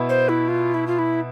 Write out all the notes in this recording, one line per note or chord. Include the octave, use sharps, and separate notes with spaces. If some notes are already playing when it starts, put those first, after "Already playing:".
Already playing: B2 B3 E4
C5
E4
F4
E4
F4
E4